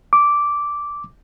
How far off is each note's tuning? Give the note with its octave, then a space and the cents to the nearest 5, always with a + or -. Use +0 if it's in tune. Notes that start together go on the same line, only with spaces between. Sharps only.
D6 -10